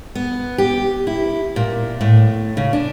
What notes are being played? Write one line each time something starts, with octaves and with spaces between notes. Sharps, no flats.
B3
G4
E4
A#2
A2
C#3
D4